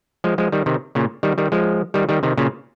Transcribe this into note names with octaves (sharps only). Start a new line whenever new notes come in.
F3 G#3
F3 G#3
D#3 G3
C3 D#3
A#2 C#3
D#3 G3
D#3 G3
F3 G#3
D#3 G3
D#3 G3
C3 D#3
A#2 C#3